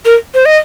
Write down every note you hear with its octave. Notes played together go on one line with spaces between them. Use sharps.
A#4
C5
D#5